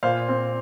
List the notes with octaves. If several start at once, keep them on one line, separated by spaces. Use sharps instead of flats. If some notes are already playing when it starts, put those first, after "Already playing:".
A#2 C5 F5
C4